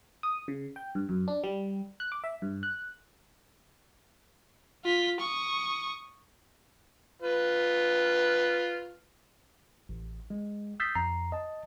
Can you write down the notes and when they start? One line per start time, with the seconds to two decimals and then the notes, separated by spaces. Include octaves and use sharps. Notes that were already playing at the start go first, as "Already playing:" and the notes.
0.23 D#6
0.48 C#3
0.76 G5
0.95 G2
1.09 F#2
1.28 D4
1.44 G3
2.00 F#6
2.12 D6
2.24 E5
2.42 G2
2.63 F#6
4.85 F4 B6
5.20 C#6 D#6
7.22 F4 B4
9.89 A1
10.30 G#3
10.80 D#6 E6 G6 A6 B6 C7
10.95 F2 A#5 C7
11.32 D#5 A5